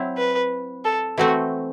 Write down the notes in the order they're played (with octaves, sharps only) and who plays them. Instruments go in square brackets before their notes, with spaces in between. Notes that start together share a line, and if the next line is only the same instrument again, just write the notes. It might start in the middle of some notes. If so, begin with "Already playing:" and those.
Already playing: [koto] F#3 C4 E4
[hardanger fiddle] B4
A4
[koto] E3 A3 C4 [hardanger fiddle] F#4